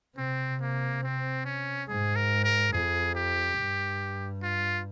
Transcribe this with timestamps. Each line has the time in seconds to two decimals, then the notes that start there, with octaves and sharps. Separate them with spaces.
0.17 C3 C4
0.61 A#3
1.03 C4
1.45 C#4
1.88 G#2 G#4
2.16 A#4
2.44 A#4
2.72 F2 G#4
3.15 G4
3.58 G2
4.43 F4